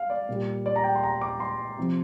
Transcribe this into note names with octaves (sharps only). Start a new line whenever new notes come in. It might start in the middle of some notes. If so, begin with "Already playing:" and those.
Already playing: F5
D5
A#2 G3
D5
A#5
G5
C6
A#5
D6
C6
C3 F3